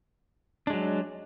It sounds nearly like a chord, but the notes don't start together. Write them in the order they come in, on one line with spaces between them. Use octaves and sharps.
D4 G#3 F#3